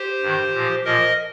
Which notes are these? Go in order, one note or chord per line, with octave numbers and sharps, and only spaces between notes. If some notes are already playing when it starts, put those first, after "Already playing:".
Already playing: G4 C5
G2 D#3
A#2 F3
A#2 F3 A#4 D#5